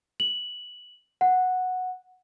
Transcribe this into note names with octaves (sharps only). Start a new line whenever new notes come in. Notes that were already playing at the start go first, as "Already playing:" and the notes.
F#7
F#5